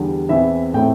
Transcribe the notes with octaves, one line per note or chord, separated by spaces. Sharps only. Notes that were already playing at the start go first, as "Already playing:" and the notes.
Already playing: E2 D3 G3
E2 E3 C4 E4 E5
A2 A3 C4 E4 G5